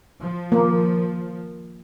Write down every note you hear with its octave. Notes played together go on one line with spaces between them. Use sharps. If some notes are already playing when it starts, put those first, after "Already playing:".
F3
A#3